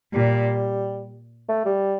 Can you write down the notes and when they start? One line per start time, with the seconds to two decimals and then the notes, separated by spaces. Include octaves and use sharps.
0.14 A#2 G3
1.49 A3
1.65 G3